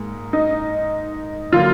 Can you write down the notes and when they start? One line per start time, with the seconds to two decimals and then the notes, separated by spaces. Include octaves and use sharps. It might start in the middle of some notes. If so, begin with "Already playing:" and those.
Already playing: G#2 A#3 G#4
0.33 D#4
1.52 D3 F#3 A#3 F4